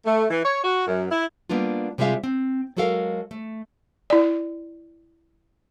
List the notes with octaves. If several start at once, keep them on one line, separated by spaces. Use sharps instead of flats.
A3
E3
C#5
F#4
F#2
E4
G3 A#3 B3 D4 F4
C3 G3 G#3 F4 E5 F5
C4
F#3 G#3 F#4 A4 A#4 F5
A3
E4 D5